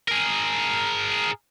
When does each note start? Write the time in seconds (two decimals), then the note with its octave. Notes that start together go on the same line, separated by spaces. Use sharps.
0.08 G#4 A#4